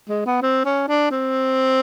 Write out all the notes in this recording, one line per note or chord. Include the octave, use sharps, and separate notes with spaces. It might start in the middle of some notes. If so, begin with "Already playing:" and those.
G#3
B3
C4
C#4
D4
C4